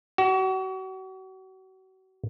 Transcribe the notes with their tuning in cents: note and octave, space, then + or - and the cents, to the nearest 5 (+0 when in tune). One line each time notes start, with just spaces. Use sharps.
F#4 +35